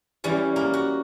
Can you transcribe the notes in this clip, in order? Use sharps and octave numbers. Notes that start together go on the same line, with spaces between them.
E3 G3 C#4
A#3
F#4